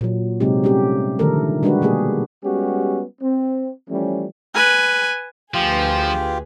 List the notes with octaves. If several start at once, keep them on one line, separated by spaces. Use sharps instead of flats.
A#2 F#3
C3 F#3 G#3 C4 D#4 G4
G3 A3 C#4 G4
D3 D#3 F3 A3 A4 A#4
G3 G#3 D4 F#4 G4 B4
B2 G3 A#3 G4 G#4
G3 G#3 B3 C#4 F#4 G4
C4
E3 F3 G3 A3 C#4
B4 G#5
D2 F3 F4 G4 G#4 B4